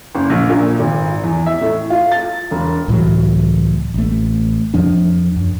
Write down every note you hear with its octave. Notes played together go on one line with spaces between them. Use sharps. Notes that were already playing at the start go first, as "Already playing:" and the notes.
F#1
A#1
A#2
G#1
E2
E5
A2
F4
A6
E1
C#2 A2 E3 F#3
A1 A3
F2 F3 D4
F#2